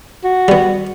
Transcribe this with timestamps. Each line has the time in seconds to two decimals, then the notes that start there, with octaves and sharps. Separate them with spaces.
0.24 F#4
0.48 G3 B3